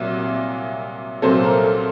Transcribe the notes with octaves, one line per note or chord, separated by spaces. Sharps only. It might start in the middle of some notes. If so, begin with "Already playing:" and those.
Already playing: C2 A#2 F#3
C2 A#2 F#3 A4 C5
A#4
A4